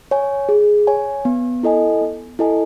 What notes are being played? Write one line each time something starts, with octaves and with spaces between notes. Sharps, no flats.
C#5 G#5
G#4
C#5 G#5
B3
E4 A4 D#5 G#5
B3
E4 A4 D#5 G#5